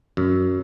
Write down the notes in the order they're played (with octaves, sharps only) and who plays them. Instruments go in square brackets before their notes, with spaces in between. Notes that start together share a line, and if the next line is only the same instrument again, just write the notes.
[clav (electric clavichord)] F#2